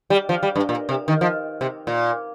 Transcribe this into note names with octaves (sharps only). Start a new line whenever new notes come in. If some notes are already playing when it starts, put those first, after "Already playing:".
G3
F3
G3
G2
A#2
C3
D#3
F3
C3
A#2